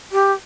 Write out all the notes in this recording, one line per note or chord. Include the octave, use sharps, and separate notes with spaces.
G4